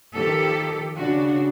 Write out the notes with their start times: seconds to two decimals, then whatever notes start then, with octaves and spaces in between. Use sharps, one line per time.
0.14 D#3 F3 G4 A4
0.96 C#3 D4 F#4